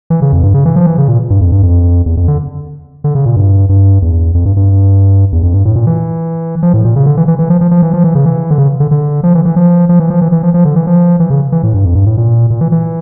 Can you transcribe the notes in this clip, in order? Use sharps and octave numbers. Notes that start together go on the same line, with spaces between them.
E3
C#3
F2
G2
C#3
E3
F3
E3
C#3
A#2
G2
F2
G2
F2
E2
F2
D3
D3
C#3
A#2
G2
G2
E2
F2
G2
G2
E2
F2
G2
A2
A#2
E3
F3
A2
A#2
C#3
D3
E3
E3
E3
F3
F3
F3
E3
F3
E3
C#3
E3
D3
C#3
D3
D3
F3
E3
E3
F3
F3
E3
F3
E3
E3
F3
F3
D3
E3
F3
E3
C#3
E3
A2
G2
F2
G2
A2
A#2
A#2
E3
E3